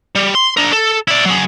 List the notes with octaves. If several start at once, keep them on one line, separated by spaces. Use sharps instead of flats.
G3
C6
D4 A#4
A4
E4 D5
F#3 G#4